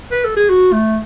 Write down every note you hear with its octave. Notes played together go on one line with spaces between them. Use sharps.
B4
A4
G#4
F#4
A3